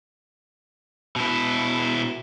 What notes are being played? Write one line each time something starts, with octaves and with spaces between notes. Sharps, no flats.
B2 E4